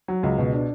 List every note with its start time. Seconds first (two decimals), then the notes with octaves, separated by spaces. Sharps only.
0.08 F#3
0.23 C#2
0.38 B2
0.53 D4